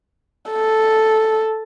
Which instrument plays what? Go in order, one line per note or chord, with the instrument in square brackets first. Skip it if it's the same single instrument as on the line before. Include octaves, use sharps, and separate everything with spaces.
[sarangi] A4